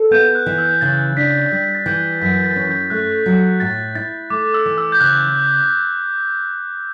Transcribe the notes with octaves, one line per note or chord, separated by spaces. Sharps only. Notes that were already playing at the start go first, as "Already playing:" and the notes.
Already playing: A4
B3 G6
F#6
E3
E6
C#3 A6
D4 B6
G3 A6
A6
E3 G6
F#2 B6
A6
C#4
G6
A3 F#6
F#3
A2 A6
E4 A6
A3 D6
E6
E3
E6
G6
C#3 F#6